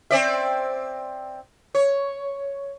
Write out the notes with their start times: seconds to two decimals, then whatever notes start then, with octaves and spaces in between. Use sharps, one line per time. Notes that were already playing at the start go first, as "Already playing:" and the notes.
0.11 C4 D5 E5
1.75 C#5